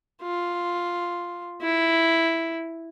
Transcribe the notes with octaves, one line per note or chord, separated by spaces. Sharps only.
F4
E4